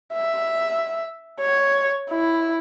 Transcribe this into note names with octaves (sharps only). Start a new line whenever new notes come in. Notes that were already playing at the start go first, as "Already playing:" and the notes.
E5
C#5
E4